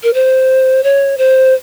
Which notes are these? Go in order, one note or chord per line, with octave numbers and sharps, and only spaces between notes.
A#4
C5
C#5
C5